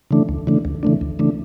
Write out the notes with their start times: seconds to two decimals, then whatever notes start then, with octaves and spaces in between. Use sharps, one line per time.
0.11 C#3 E3 A3 D4
0.29 D2
0.47 C#3 E3 A3 D4
0.65 D2
0.83 C#3 E3 A3 D4
1.01 D2
1.19 C#3 E3 A3 D4